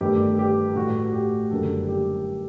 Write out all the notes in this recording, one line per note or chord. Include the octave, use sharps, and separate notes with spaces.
G1 G2 D#3 A3 G4
G4
A1 A2 A3 F#4
G4
F#1 F#2 D3 G3 A#3 A4
G4